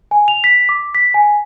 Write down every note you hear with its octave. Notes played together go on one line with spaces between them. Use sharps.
G#5
F7
B6
D6
B6
G#5